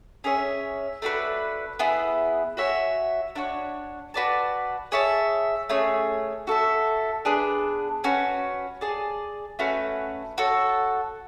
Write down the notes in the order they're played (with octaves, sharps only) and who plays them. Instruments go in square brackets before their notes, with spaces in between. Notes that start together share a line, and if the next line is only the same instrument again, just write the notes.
[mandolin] C#4 G#4 C#5 E5
A3 D4 F#4 B4
B3 E4 G#4
F#4 C#5 E5 G#5
D4 F#4 C#5
F#4 B4 D5 A5
G#4 C#5 E5 A5
A3 C#4 G#4 C#5
F#4 A4 E5
B3 D4 G#4
C#4 F#4 B4
G#4 D5 A5
A3 C#4 F#4 B4
F#4 A4 C#5